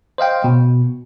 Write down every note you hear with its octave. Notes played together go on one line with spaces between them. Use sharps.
C5 D#5 F5 G5
B2